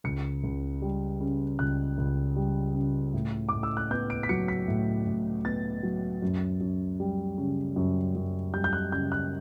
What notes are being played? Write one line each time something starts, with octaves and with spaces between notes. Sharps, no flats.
C#2 C#7
C#2
G3
C#3
C#2 F#6
C#2
G3
C#3
A2
A2 D6
E6
F#6
B3 G6
D7
B6
F#3 C#7
B6
A2
A2
B3 A6
F#3
F#2
F#2
G3
C#3
F#2
F#2
G3 G6
G6
F#6
C#3 G6
F#6